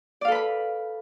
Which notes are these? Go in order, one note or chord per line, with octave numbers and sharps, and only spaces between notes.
A4 B4 D5 F5 B5